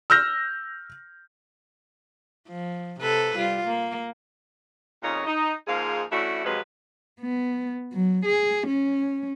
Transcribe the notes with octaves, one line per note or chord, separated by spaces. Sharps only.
E6 F6 G6 A#6
F3
C3 A4 B4
G3 F4
A#3
F2 A#2 C#3 D#4 C#5 D#5
D#4
G#2 F3 G#3 A#3 G#4 F5
E3 A3 C#4 D4 E4 F#4
F2 C3 F3 F#3 G#3 B4
B3
F#3
G#4
C#4